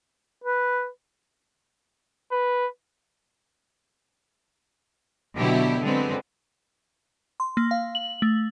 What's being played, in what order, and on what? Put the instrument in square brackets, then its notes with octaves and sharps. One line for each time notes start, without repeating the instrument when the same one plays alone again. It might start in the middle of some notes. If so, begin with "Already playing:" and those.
[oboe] B4
[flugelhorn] B4
[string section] B2 D3 F#3 E4 G4
D3 F#3 G#3 B3 C4
[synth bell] C6
A#3
F5
F#7
A3